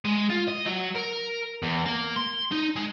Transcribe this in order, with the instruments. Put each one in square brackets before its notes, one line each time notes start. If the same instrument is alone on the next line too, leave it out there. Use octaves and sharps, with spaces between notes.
[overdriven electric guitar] G#3
F4
D#5
F#3
A#4
E2
A#3
C6
D#4
G#3